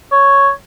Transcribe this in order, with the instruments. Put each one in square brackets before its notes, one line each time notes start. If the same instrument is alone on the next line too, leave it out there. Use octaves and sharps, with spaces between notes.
[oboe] C#5